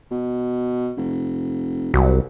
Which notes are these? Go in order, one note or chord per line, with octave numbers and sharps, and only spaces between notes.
B2
F1
C2 F#3